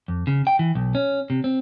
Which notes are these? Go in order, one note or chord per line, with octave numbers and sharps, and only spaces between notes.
F2
C#3
G5
E3
B1
C#4
C3
C4